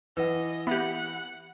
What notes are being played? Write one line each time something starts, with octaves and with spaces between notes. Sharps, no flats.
E3 B4 D#5 F#5 E6
B3 G4 E5 F#5 B5